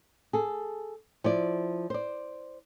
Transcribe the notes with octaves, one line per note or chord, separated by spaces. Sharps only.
G#4 A4
F3 E4 D5
C5 D5